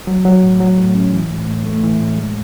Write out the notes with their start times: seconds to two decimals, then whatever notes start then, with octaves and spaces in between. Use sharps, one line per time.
0.07 F#3
0.25 F#3
0.42 A2
0.60 F#3
0.78 A2
0.95 C#4
1.12 E3
1.31 A2
1.47 A2
1.65 A3
1.83 E3
2.00 A2
2.18 G#3